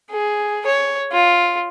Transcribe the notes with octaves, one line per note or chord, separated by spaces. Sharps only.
G#4
C#5
F4